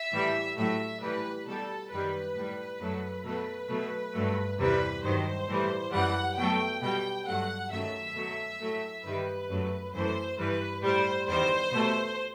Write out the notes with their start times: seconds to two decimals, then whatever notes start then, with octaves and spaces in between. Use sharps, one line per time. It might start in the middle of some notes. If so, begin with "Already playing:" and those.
Already playing: E5
0.13 A2 E3 G3
0.57 A2 F#3 A3 E5
1.01 A2 E3 G3 B4
1.46 B2 G3 A4
1.91 F#2 D#3 G3 B4
2.35 A2 G3
2.80 F#2 F#3 A3
3.24 B2 F#3 A3 B4
3.69 B2 F#3 A3
4.14 G2 F#3 A3
4.58 E2 C3 E3 G3 B4
5.03 G2 D#3 F#3 C5
5.48 A2 E3 G3
5.92 F#2 E3 G3 F#5
6.37 B2 F#3 A3 G5
6.82 B2 G3 G5
7.26 G2 F#3 A3 F#5
7.71 F#2 D#3 F#3 A3 E5
8.15 B2 F#3 A3
8.61 A2 F#3 A3
9.04 G2 D#3 G3 B4
9.49 F#2 F#3 A3
9.93 F#2 E3 A3 C5
10.38 G2 E3 G3 B4
10.82 A2 G3 C5
11.27 E2 D#3 G3 C5
11.72 B2 A3